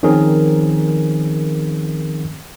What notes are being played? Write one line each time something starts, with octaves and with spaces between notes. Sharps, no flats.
D#3 F3 C4 C#4 G#4 A#4